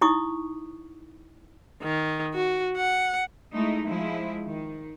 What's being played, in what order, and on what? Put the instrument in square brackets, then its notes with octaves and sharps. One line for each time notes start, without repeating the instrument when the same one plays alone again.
[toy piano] D#4 E4 C#6 D#6
[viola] D#3
F#4
F#5
[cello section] G#3 A3 D#4 E4
F3 G#3 E4
D#3